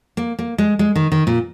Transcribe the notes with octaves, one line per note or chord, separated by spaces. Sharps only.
A#3
A#3
G#3
G#3
D#3
D#3
A#2